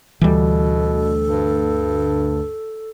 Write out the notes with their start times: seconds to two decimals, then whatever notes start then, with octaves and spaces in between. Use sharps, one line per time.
0.21 D2 B2 E3 G3 A4
1.25 G2